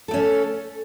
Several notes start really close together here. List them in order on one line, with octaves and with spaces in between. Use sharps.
A4 A3 C#4